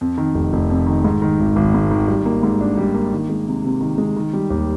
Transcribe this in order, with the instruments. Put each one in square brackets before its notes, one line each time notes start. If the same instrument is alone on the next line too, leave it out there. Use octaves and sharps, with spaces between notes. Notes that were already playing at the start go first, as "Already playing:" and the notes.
[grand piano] F2
D#3
F1
F1
F2
D#3
G#2
D#3
G#1
G#1
G#2
D#3
G3
A#3
G#2
D4
G3
A#3
D#3
G#3
C3
C3
D#3
G#3
D#3
G3
D#2